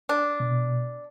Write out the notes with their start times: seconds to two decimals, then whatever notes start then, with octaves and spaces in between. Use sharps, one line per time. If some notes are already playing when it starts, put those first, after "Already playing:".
0.09 D4
0.40 B2